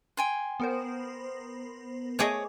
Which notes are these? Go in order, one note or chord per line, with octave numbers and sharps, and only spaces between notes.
G5 G#5 C6
B3 A#4 C5
A3 G#4 C#5 D#5 D6 D#6